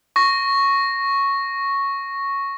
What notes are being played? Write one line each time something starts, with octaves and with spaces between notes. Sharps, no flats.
C#6 A#6